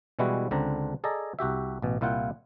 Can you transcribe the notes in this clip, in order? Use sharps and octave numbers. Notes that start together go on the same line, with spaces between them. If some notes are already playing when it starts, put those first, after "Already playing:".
B2 E3 G3 G#3 E4 F#4
C#2 D3 C4 D4 A#5
G#4 A4 D5 D#5 A#5
C2 F#4 G4 E5
A1 B2
C2 A#2 E4 F4 F#5 G5